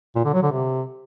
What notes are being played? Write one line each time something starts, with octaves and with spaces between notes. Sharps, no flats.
A#2
D3
F#3
D3
C3